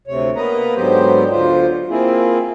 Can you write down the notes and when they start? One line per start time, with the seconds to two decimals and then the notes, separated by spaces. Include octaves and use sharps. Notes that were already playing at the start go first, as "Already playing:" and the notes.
0.07 D2 C3 C#5
0.36 A#3 B3 B4 D#5 A#5
0.76 G#2 D3 F#3 B3 G4 C5
1.31 D2 F4 C5
1.90 A#3 C4 E4 F4 G#4